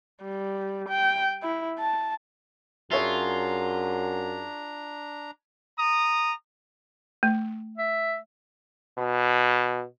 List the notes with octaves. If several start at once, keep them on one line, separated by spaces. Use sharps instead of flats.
G3
G5
E4
A5
F#2 D4 F4 G#4 C#5 E5 A#5
A#5 D#6
A3
E5
B2